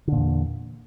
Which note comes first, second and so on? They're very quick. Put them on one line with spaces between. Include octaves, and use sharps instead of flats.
D3 A#2 E2